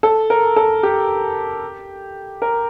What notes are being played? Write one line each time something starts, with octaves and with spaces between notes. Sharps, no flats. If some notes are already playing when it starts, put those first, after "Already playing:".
A4
A#4
A4
G4
A#4